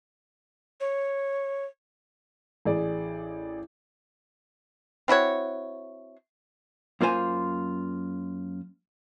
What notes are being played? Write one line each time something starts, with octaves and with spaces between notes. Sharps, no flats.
C#5
A1 G#4 D5
C4 E4 F#4 C#5
F#2 A#3 F4 C5 G#5